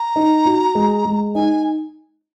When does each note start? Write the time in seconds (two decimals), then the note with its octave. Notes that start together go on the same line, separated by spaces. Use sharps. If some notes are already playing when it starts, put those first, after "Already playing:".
Already playing: A#5
0.16 D#4
0.46 F#4
0.75 G#3
1.05 G#3
1.35 D#4 G#5